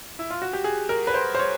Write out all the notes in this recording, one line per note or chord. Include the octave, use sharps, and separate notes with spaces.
E4
F4
F#4
G4
G#4
A#4
B4
C5
C5
C#5